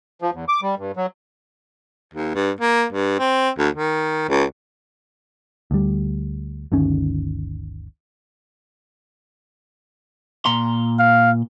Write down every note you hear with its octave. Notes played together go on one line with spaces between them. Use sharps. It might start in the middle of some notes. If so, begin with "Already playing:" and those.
F3
E2
D6
G3
G2
F#3
D#2
G2
A#3
G2
C4
D2
D#3
C#2
D2 G3
G1 D2 D#3 C#4
A#2 A#5 C6
F5